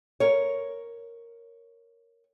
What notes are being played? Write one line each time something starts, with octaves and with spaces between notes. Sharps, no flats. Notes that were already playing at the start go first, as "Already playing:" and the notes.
A#4 C#5